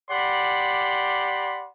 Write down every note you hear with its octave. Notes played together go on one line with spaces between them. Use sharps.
G4 D5 F#5 B5 C6